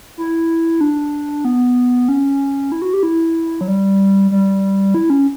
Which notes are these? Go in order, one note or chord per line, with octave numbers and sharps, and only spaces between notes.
E4
D4
B3
C#4
E4
F#4
G4
E4
F#3
G3
G3
E4
C#4